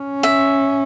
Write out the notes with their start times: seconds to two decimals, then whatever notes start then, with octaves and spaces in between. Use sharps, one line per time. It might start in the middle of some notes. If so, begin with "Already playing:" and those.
Already playing: C#4
0.23 E5